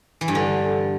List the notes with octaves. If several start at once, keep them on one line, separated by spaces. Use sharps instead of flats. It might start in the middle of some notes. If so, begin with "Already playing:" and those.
E3
G2
D3